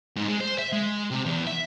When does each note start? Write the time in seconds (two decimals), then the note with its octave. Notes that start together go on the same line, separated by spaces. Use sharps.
0.16 G#2
0.28 G#3
0.40 C5
0.59 E5
0.72 G#3
1.11 C3
1.26 E2
1.47 E5